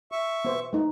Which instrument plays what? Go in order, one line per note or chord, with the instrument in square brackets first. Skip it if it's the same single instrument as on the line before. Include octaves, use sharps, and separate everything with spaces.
[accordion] E5 C#6
[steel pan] B3 C5
A3 D#4